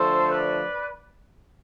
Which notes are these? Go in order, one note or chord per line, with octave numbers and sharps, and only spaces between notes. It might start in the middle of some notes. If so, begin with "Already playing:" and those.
Already playing: D3 F3 A3 A4 C5
B4 D5